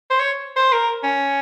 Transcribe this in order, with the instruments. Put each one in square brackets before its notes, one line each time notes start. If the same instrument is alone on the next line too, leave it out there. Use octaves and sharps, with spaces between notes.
[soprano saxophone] C5
C#5
C5
A#4
C#4